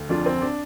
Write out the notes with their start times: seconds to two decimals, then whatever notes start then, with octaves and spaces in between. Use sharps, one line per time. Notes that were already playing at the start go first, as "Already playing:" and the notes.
Already playing: D2
0.09 F2 D4 F4
0.26 C4
0.42 D4